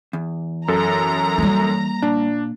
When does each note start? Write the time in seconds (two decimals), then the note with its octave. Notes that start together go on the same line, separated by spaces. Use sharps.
0.13 E2
0.68 F#2 A4 A#5
1.38 G3 A#3
2.02 A#2 D4